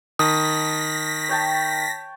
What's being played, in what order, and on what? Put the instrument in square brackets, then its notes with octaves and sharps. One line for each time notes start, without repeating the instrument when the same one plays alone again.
[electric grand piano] D#3 [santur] A5 [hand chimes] D#6 [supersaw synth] A#6 B6
[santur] C#5 G5 A5